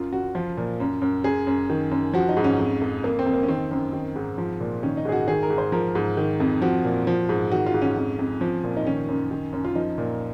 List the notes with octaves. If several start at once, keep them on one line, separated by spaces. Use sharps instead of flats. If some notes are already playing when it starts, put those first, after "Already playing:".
Already playing: F#2 F4
F#2 F#4
F3 F4
A#2
F#2
F#2
F#2 G#4
F#2
D#3
F#2
F3 F#4
D#4
G#2
C#4
F2
F2
F2 A#3
C4
F2
A#3
C#4
D#3 C4
F#2
D#3
G#2
F3
A#2
D#3 C#4
D#4
G#2 G#4
F#4
D#3 G#4
A#4
G#2
C5
F3 A#4
G#2
D#3
F2
F3 F#4
A#2
F3
G#2
D#3 F#4
F4
G#2
C#4
F2
F2
F3
A#2
D#4
D#3 C#4
F#2
D#3
F#2
F4
F3 D#4
A#2